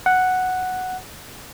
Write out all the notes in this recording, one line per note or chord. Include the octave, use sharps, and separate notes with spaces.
F#5